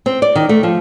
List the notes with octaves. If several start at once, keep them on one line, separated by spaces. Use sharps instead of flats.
C4
D5
D#3
A3
F3